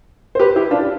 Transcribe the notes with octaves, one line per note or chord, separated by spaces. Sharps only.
C5
G4 B4
E4 G4
D4 F4